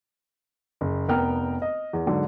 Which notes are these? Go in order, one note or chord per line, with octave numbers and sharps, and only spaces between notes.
F#1
F1 B3 A#4 G5 F6
D#5
E2
G#2 D3 F#3